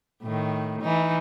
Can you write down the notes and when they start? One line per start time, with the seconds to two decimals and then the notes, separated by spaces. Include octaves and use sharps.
0.23 A2 D#3
0.81 E3 D#4